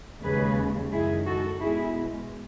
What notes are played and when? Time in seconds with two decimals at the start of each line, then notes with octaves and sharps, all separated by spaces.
0.23 D#2 C#3 G#3 G#4 B4
0.92 F#2 D#3 G#3 E4 G#4
1.26 F#4 A4
1.60 B2 G#3 E4 G#4